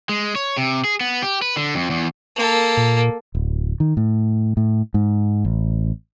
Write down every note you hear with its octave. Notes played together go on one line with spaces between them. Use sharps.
G#3
C#5
C3
G#4
B3
G4
B4
D3
F2
E2
A#3 A4
A#2
D1
D#3
A2
A2
G#2
A1